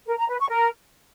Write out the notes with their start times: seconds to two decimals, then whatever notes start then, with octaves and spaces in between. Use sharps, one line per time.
0.07 A#4
0.18 A#5
0.28 B4
0.39 C#6
0.49 A#4